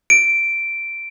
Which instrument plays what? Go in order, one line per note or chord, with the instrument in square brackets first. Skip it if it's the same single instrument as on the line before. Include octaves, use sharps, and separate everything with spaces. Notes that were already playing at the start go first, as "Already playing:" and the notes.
[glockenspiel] D7